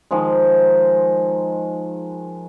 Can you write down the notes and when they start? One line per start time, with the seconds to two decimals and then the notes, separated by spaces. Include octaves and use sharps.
0.11 D#3 F3 G#3